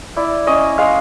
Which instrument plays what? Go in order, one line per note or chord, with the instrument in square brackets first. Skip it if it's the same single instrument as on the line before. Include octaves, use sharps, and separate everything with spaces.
[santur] E4 D5
C#4 D#5
G#3 F5